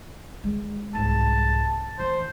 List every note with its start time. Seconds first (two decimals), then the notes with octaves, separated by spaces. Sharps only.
0.44 G#3
0.95 C2 G#2 A5
1.99 E3 C5